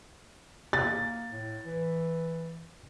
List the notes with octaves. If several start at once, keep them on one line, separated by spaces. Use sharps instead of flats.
A#3 A6
A2
E3